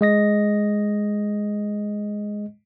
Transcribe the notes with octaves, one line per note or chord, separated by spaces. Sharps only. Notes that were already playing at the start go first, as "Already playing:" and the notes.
G#3 D#5 A#6